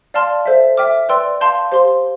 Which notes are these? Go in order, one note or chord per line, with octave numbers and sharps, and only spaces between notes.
D5 F5 A5 C6 F6
A4 C5 E5
E5 G5 D6 F6
B4 D5 G5 C6 E6
F5 A5 C6 G6
G4 C5 F5 C6